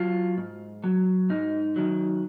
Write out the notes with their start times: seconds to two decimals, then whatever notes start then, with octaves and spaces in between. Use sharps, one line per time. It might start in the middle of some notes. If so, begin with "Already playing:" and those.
Already playing: F#3 F4
0.38 G#2
0.84 F#3
1.30 G#2 D#4
1.76 D#3 F#3